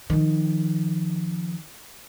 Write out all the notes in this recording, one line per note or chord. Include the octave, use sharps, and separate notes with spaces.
D#3 F3